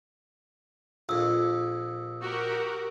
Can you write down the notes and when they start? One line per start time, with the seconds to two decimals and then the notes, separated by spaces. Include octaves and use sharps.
1.09 A#1 F2 D#6 E6
2.22 F#4 G4 A#4